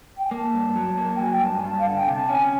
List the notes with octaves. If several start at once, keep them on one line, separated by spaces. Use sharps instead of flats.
G5
G#5
A#3 A5
G2
F#3
A#3
G5
F#3 G#5
G5
G2 A5
G#5
G2 A5
F5
D3 F#5
G5
G#5
C3 A5
G5
C#4 G#5